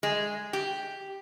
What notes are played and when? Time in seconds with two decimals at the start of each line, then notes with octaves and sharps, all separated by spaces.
0.03 G#3
0.53 G4